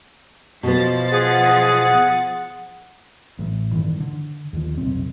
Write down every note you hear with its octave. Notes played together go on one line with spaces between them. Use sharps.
B2 F3 B3 A6
G#4 F#5
A1 A2
G2 D#3 E3
D3
D#2 F3
F1 B1 C4